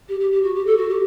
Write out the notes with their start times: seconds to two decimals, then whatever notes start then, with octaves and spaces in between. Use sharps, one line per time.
0.08 G4
0.20 G4
0.31 G4
0.43 F#4
0.54 G4
0.66 A4
0.77 F#4
0.89 G4